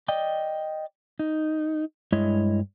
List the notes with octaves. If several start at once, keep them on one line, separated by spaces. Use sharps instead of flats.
D5 D#5 G5
D#4
G2 G#3 E4 C#5 D#5